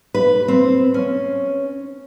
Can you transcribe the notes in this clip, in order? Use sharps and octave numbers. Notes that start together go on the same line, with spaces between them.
B4
C4
C#4